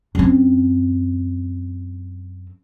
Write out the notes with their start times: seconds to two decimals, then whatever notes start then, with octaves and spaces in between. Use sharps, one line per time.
0.15 F#2 C4